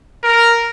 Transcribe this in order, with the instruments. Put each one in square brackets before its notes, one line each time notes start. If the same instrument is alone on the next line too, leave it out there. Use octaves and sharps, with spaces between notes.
[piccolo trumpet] A#4